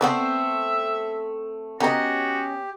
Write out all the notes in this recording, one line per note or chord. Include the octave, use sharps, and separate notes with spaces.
A3 B3 C4 C5 D5 E5 F#5
B3 C#4 F#4 G4 D#5 G5 A#5